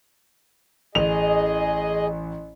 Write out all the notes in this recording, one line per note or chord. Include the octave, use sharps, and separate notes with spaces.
A1 G#4 D#5 F7